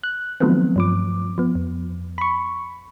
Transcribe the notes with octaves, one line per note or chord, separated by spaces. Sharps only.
F#6
D#3 F3 F#3 A3 B3 C4
G2 F3 D6
F3 B3
F2
B5 C#6